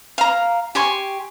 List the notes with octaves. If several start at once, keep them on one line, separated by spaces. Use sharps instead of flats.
F5 A#5
G4 G#5 C6 C#6